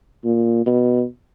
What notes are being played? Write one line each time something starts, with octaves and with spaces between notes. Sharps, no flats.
A#2
B2